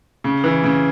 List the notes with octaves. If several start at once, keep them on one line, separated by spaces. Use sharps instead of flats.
C#3
E3
C#3